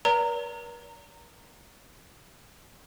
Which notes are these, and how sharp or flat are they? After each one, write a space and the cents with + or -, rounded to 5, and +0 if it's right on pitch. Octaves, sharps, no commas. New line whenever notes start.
B4 -45 D5 -40 A#5 -15